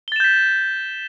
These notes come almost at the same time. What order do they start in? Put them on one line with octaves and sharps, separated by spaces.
G7 A6 E7 G6 B6